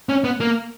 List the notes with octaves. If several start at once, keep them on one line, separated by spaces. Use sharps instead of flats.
C#4
B3
A#3